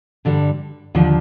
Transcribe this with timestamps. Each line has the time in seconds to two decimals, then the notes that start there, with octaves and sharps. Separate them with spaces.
0.25 G2 D3 G3
0.95 D#2 D3 F3